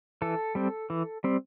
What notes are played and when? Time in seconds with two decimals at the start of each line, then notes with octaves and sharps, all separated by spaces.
0.22 E3 A4
0.55 G3 C4
0.90 E3
1.24 G3 C4